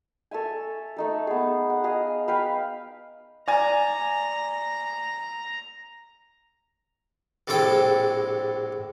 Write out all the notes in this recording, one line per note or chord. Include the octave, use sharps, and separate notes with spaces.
A4 C#5 E5 G#5
A3 D#4 A4
B3 G#4
F#5
G#4 D#5 F5
B4 F5 G5 B5
D5 G#5 A#5
A#1 A2 C3 G#3 A4 G5